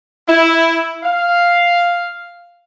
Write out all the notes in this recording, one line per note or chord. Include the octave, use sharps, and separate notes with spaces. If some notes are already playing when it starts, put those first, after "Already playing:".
E4
F5